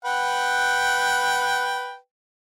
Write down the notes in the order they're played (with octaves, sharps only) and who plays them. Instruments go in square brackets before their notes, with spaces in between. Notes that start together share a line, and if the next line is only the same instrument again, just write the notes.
[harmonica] B4 F#5 G5